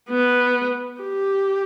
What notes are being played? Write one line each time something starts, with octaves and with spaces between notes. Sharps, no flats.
B3
G4